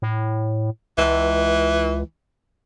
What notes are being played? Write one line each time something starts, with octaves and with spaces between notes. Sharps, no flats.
A2
C#2 E3